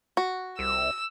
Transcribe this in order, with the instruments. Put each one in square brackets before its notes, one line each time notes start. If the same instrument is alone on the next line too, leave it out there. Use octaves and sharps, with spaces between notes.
[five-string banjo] F#4
[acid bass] C2 [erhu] E6